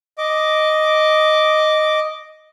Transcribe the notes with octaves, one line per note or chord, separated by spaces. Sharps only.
D#5 D6